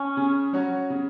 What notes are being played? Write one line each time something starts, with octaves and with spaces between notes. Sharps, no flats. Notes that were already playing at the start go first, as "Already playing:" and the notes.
Already playing: C#4
C#3
F#3 C#4 F#4 C#5
C#3